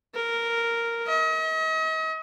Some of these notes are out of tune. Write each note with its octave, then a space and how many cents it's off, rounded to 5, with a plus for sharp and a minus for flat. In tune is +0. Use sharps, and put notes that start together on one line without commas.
A#4 -5
D#5 +40